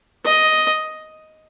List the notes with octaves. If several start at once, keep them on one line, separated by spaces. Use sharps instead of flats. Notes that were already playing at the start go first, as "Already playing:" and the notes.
D#5